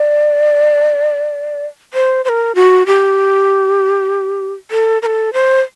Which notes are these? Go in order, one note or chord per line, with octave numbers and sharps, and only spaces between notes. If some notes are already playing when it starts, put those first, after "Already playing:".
Already playing: D5
C5
C5
A#4
F#4
G4
A4
A#4
A4
C5